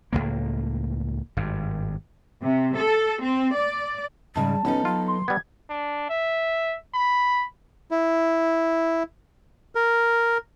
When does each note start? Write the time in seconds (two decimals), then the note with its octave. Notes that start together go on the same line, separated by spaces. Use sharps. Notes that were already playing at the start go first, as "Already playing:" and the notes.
0.13 C#2 F#2 A2 A#3
1.37 G#1 G2
2.41 C3
2.76 A4
3.21 C4
3.53 D5
4.36 G#2 C#3 G3 A5
4.65 B1 B3 C#4 D#4 A4
4.85 F#3 F4
5.08 C6
5.28 G3 B3 G#6
5.70 D4
6.10 E5
6.94 B5
7.91 E4
9.75 A#4